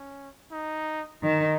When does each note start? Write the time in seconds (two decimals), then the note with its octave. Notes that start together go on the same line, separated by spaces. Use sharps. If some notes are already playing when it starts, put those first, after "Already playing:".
Already playing: C#4
0.51 D#4
1.23 D#3 D#4